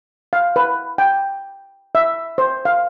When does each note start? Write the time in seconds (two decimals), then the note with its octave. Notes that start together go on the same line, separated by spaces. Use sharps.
0.33 F5
0.56 B4
0.98 G5
1.95 E5
2.38 C5
2.65 F5